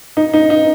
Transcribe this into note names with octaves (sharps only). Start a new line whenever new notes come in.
D#4
D#4
D#4